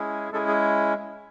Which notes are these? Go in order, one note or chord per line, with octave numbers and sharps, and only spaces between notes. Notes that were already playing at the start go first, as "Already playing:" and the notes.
Already playing: G#3 C#4 E4 G#4
G#3 C#4 E4 G#4 A4
G#4